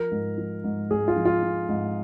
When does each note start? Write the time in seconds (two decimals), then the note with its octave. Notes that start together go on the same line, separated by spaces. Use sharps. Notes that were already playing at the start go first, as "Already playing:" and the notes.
Already playing: F3 A#4
0.12 G#2
0.38 F3
0.64 G#2
0.90 G#2 G#4
1.08 F4
1.16 F3
1.25 F4
1.43 F3
1.69 G#2